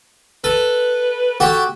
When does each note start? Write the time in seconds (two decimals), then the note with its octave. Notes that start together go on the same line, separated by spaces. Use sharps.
0.44 A4 B4
1.40 F#4 G4 A4